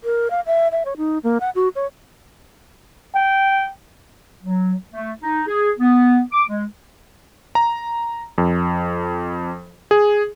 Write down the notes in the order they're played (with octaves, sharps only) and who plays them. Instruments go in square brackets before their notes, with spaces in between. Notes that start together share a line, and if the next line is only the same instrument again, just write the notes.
[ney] A#4
F5
E5
E5
C#5
D#4
A#3
F#5
F#4
C#5
[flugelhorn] G5
[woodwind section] F#3
A3
D#4
G#4
B3
D6
G#3
[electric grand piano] A#5
F2
G#4